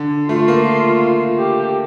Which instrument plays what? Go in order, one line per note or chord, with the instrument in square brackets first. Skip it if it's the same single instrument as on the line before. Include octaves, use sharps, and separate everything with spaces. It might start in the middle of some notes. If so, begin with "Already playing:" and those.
Already playing: [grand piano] D3
[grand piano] A3 [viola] F4
[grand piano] A#3
[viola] G4